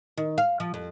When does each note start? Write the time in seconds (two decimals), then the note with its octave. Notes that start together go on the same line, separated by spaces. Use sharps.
0.17 D#3
0.38 F5
0.60 F3
0.74 F2